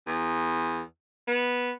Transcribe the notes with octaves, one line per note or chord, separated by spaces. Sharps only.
E2
B3